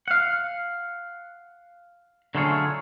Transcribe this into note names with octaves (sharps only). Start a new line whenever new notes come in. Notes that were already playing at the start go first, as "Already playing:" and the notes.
F5 F#5
D3 F#3 A3 F4 G#4 C#5